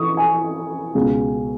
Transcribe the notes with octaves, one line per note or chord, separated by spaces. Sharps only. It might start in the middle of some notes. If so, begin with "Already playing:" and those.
Already playing: E3 C#6 D#6
G#5
C#2 B2